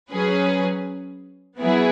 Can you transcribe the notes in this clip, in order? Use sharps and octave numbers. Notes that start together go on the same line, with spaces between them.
F#3 C#4 G#4 B4
F#3 B3 E4 G#4